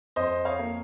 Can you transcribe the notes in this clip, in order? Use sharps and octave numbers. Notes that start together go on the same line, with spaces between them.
F2 C5 D#5
C#5 F5
A#3